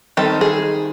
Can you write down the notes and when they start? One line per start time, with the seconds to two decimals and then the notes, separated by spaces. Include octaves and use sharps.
0.17 D#3 G3 C4 D#4 A4
0.41 G#4